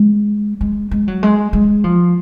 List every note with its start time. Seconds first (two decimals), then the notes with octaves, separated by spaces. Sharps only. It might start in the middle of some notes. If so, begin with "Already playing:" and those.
Already playing: G#3
0.61 G#3
0.91 G#3
1.08 F#3
1.23 G#3
1.53 G#3
1.84 F3